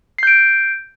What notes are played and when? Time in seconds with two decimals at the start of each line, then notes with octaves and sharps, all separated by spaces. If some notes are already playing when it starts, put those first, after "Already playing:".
0.18 C7
0.23 G6
0.27 D7